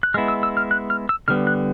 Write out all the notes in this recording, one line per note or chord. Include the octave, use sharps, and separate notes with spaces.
F#6
G#3 B3 E4 F6
E6
E6
F6
F#6
F6
E6
D3 G3 B3 F6
F#6